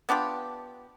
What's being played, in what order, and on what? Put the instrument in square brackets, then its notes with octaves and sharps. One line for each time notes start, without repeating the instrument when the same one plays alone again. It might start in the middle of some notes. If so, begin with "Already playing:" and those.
[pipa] B3 D4 F4 G4